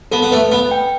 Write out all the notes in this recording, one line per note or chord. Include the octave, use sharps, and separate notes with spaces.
B3 A4
B3
A3 B4
B3 B4
G5